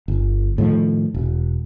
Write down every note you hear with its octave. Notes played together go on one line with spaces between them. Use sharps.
G1
A2 D#3 F3
E1